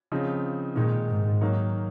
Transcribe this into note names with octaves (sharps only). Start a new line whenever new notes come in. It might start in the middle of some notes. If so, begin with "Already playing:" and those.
C#3 F3 C4 D#4
A#2 D#3 G#3 D#4
G#2
D#3 F#3 A#3 D#4